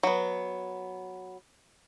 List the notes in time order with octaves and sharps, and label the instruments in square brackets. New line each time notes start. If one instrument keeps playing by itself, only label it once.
[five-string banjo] F#3 B3